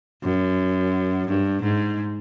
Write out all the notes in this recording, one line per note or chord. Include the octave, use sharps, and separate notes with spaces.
F#2
G2
G#2